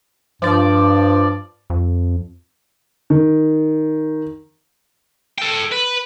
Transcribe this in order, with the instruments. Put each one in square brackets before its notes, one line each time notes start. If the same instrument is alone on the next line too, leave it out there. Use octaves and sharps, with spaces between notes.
[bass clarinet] G2 [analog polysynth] F3 D5
[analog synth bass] F2
[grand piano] D#3
[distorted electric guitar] A4 G5
B4